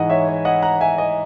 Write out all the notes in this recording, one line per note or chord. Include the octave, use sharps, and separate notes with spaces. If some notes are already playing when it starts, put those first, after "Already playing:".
Already playing: G#2 E3 D#5 F#5 A#5
C#5 E5
C#5
D#5 F#5
F#5 A#5
E5 G#5
D#5